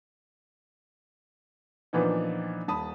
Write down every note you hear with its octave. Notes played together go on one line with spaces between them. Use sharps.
A#2 E3 F3 B3 D4 D#4
D#1 A5 B5 D#6